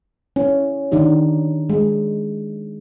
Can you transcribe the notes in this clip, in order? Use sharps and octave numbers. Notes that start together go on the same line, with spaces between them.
C#4 E4
D#3 D4 D#4 G4
G#3